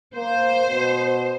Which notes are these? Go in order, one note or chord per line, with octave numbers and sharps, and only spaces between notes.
A#3 C5
B2